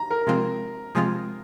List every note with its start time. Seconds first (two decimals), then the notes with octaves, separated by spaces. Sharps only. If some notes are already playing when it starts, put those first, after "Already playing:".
Already playing: A#5
0.10 A#4
0.27 C3 F3 G#3 C4 F4
0.95 C3 F3 G#3 C4 F4